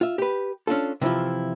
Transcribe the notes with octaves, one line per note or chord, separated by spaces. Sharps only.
F4 E5
G4 B4
C#4 D4 F4 A4
C3 E3 F3 E4 F4